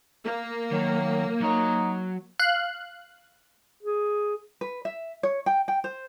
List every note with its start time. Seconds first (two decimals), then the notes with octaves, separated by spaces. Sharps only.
0.24 A#3
0.72 D#3 F#3
1.41 F#3 D#4 C#5
2.39 F5 F#6
3.83 G#4
4.61 B4
4.85 E5
5.23 C#5
5.46 G5
5.68 G5
5.84 C5